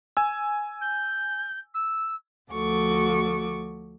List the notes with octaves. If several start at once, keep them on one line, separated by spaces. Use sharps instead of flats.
G#5 E6
G6
E6
D2 F3 F#4 A4 C#6 D6